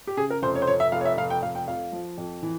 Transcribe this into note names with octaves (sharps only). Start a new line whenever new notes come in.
G4
C#3 G#4
A#4
F1 C5
C#5
C5
F1 C#5
E5
F1 F5
C#5
E5
F1 F5
G5
F1 F5
G5
F2 F5
F3
F2
E3